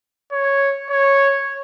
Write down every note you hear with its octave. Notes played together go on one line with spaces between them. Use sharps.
C#5
C#5